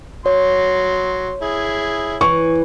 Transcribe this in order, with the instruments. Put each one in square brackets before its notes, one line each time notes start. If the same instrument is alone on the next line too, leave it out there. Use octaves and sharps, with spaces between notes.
[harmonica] F#3 C6 [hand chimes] C#5
[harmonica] E4 G#4
[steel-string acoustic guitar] E3 [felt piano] C#6